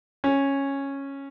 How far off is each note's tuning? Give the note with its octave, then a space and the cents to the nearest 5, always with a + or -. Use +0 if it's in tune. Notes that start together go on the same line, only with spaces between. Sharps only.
C#4 -10